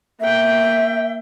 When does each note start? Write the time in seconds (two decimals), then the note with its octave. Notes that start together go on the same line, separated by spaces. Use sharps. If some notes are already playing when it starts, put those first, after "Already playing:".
0.20 A#3 E5 G5